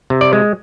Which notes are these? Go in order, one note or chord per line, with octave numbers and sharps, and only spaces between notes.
C3
D5
G#3